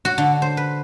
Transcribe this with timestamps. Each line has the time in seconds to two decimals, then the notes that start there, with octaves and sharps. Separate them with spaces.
0.05 F#4
0.18 D3
0.42 C5
0.57 B4